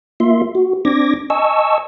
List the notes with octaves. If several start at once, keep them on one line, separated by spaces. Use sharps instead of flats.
A#3 F4 E5 C6
F#4
C4 D4 D6 G#6 A#6
D#5 G#5 A5 C#6 E6